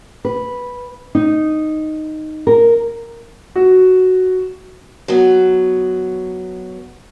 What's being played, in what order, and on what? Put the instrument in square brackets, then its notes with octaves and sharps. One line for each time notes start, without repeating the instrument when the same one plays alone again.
[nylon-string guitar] B4
D#4
A#4
[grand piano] F#4
[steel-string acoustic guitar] F#3 B3